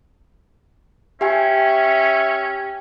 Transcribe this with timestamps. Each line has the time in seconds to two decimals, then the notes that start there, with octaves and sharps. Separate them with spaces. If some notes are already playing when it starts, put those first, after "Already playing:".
1.21 C#4 G4 E5 G5 G#5